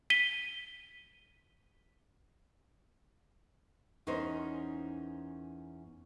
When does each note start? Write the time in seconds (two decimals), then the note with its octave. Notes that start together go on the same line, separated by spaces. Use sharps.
0.10 B6 D#7 G7
4.07 E2 C#4 D#4 A#4 C5